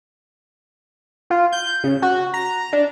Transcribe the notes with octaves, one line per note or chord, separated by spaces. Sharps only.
F4
G6
C#3
F#4
A#5
D4